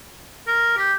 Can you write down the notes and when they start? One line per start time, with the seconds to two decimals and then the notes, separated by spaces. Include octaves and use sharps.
0.47 A#4
0.77 G4